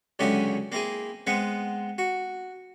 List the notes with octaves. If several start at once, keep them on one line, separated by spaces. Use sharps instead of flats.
C#2 D3 F#3 C#4 E4 G4
A#3 C4 E4 G#4
G#3 B3 C4 F#5
F#4